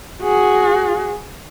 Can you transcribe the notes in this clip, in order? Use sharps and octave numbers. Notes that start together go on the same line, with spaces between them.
F#4 G#4